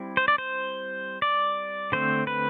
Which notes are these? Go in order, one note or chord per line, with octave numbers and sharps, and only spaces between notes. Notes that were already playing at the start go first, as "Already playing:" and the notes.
Already playing: G3 C4 E4
C5
D5
C5
D5
D3 A3 C4 C5
B4